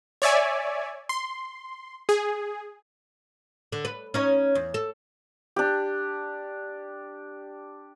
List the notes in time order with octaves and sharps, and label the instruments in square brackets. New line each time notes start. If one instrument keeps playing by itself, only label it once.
[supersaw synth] C#5 D5 E5 G#5
C6
G#4
[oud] D3
B4
C#4 D#4 C#5
E2
A4
[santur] D4 G4